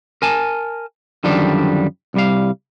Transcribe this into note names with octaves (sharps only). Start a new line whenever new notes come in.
A#4 G#5 A5
F#2 D3 D#3 F3 G3 D4
C2 G3 F5